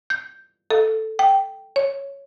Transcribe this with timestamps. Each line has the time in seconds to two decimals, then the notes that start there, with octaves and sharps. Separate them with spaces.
0.10 G6
0.71 A4
1.19 G5
1.76 C#5